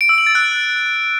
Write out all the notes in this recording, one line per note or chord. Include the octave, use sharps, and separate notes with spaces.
D7
E6
F#7
A6
F#6